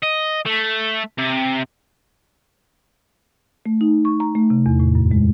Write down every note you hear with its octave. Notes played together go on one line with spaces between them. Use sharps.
D#5
A3
C3
A3
D#4
C#6
A#5
A3
C3
E2
A2
F#2
G#3